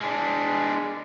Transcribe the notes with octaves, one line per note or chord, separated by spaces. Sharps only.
G#3 D4